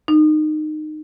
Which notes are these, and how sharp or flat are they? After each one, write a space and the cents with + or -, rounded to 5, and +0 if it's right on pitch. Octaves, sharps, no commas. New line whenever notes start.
D#4 -20